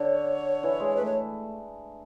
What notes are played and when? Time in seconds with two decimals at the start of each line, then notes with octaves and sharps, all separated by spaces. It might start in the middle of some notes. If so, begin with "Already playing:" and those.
Already playing: D3 C#5
0.63 E3
0.80 G#3
0.97 A3 B4
1.06 C#5